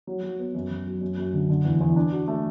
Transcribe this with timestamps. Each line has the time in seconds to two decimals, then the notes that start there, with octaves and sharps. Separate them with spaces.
0.07 F#3
0.23 F#3
0.39 B3
0.55 F#2
0.70 F#2
0.86 F#3
1.01 F#2
1.17 F#2
1.33 D3
1.49 D3
1.65 E2
1.80 E2
1.96 D4
2.12 F#4
2.28 A3